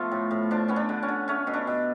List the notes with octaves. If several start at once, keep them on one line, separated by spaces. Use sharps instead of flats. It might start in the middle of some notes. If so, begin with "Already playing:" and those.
Already playing: F3 A3 B3 F4
A2
A2
F3 D4
B3 C#4
D4
D3
C#4
D3
A3 C#4
B2
D4
B2